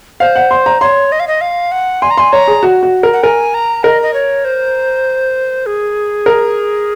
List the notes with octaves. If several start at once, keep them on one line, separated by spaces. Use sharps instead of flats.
C5 F5
F#5
C6
A#5
C#5 C6
D#5
F5
D#5
F5
F#5
G#5 C6
A#5
G#5 C6
C#5 A#5
G#4
F#4
F#4
A#4
F#5
A#4 G#5
A#5
A#4 D#5
D#5
C#5
C5
G#4
A#4